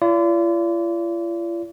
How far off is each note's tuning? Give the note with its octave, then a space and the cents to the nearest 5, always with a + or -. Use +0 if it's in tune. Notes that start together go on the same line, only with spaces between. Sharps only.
F4 -45 D5 -35